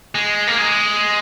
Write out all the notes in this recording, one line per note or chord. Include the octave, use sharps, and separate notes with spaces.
G#3
A#3
G#3